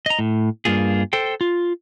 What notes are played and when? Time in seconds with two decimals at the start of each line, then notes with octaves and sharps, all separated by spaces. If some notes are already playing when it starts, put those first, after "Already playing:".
0.06 D#5 A#5
0.19 A2
0.65 G2 A#3 F4 G#4
1.13 A4 C5 G5
1.41 F4